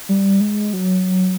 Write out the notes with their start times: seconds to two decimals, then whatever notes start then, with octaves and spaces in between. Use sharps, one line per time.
0.09 G3
0.41 G#3
0.73 F#3